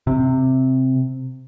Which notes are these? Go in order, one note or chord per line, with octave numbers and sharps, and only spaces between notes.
C3